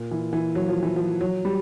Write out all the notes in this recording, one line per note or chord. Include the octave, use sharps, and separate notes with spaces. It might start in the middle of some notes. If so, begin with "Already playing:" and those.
Already playing: A#2
E3
E3
F#3
F3
E3
F3
F#3
G3